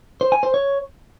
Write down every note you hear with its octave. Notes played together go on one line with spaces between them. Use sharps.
C5
G#5
C5
C#5